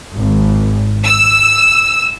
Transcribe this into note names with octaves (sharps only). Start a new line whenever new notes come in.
G#1
E6